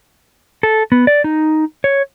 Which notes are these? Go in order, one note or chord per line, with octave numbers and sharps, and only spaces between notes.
A4
B3
D5
D#4
C#5